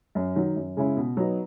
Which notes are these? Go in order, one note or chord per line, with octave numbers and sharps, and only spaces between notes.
F#2
D#3 F#3
F#2
C#3 G#3 C#4 E4
B2
F#3 B3 D#4